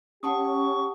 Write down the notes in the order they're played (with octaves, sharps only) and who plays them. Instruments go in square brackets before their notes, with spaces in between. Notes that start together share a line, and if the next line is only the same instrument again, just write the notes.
[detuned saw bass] C#4 [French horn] G4 [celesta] F#5 A5 D#6 [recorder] C#6